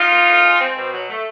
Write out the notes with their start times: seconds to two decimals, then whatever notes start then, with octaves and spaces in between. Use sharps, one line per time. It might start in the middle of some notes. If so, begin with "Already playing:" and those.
Already playing: D#4 F4
0.10 A#3
0.26 A2
0.43 G#3
0.60 C4
0.75 B2
0.92 F#3
1.09 A3